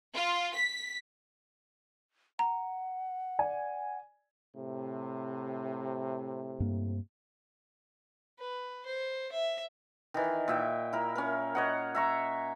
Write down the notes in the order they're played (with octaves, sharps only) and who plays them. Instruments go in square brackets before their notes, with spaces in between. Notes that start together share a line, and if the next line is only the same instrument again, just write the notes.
[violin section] F4
B6
[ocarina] F#5 [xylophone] A#5
[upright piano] D5 G#5
[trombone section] A2 C3
[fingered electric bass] G2 A#3
[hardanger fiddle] B4
C5
E5
[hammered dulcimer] D#3 E3
A#2 E5 G5
E4 A#4
C#4 A#4
C#5 D#5 F#5
E5 A#5 C#6